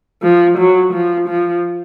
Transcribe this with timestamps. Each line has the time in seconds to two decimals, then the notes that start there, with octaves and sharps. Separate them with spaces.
0.22 F3
0.58 F#3
0.93 F3
1.28 F3